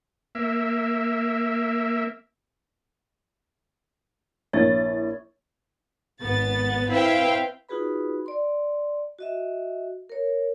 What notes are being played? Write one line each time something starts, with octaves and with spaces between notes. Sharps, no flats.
A#3 E5
A#1 E4 C#5 A6
G#1 B3 A6
C4 E4 B4 E5 F5 G5
D#4 F4 F#4 G#4 B4 B5
D5 C6
F#4 D#5 E5
A#4 C#5